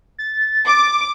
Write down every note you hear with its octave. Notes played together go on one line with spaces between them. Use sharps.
A6
D6